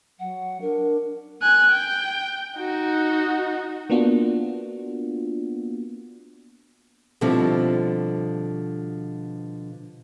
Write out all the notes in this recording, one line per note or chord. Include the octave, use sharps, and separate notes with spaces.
F#3 F#5
D4 A#4
G#5 F#6
G5
D#4 F#4
A#3 B3 D4 F4 F#4
B2 D3 F3 G3 C4 E4